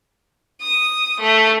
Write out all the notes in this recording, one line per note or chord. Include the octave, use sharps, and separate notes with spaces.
D#6
A3